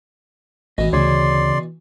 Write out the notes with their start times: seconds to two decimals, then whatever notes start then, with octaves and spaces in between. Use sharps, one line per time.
0.78 A1 B2 E3 D#5
0.93 D2 C#3 G#4 C#5 D5 C6